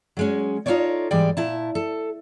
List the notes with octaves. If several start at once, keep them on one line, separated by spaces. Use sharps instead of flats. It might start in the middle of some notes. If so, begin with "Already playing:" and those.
F#3 G#3 C#4
D#4 F4 G4 A4 C#5 D5
G#2 E3 G3 G#3 D5 G5
A#2 E4 A5
A4